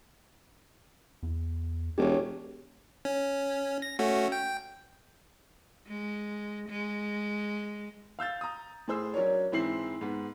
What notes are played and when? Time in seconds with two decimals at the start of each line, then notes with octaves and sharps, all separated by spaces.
1.23 E2
1.98 E1 G4 C#5
3.05 C#4
3.82 A#6
3.99 A3 C#4 F#4
4.32 G5
5.88 G#3
6.69 G#3
8.19 F5 E6 G6 A6
8.41 A#5 D#6
8.88 A2 G#4 C5 E6
9.14 F#3 C#4 D4 A#4 C#5
9.52 G#2 E3 C4 E4 C7 F#7
10.01 G#2 B3